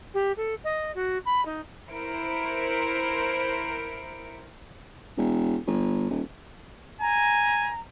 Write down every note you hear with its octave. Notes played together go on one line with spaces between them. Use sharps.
G4
A4
D#5
F#4
B5
D#4
E4 A#4 C5 C#7 D7
E1
G1
D#1
G#5 A#5